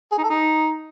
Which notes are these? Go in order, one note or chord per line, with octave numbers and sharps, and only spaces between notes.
G#4
D#4
A4
D#4